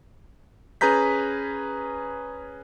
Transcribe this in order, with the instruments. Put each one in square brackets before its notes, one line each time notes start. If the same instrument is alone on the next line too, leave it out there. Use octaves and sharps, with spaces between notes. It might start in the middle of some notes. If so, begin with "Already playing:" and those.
[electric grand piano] C#4 G#4 B4 A#5 G6 B6